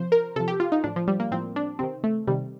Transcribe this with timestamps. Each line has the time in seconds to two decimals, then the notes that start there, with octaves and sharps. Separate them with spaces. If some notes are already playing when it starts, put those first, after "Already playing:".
Already playing: C3 F3 C5
0.12 A#4
0.36 C3 F3 A4
0.48 G4
0.60 F4
0.72 D#4
0.84 A2 F3 D4
0.96 F3
1.08 G3
1.20 A#3
1.31 A2 F3 C4
1.56 D4
1.79 C3 D#3 C4
2.04 A3
2.27 C3 D#3 G3